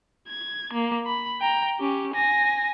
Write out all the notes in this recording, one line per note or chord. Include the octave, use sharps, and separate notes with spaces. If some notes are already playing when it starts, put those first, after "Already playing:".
G#6
A#3
B5
G5 A#5
C#4 G4
G#5 A#6